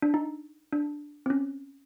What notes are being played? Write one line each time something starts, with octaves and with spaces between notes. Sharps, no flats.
D4
D#4
D4
C4
C#4